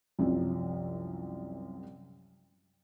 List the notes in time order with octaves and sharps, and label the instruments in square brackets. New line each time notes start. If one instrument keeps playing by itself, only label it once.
[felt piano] C2 F#2 C3 F3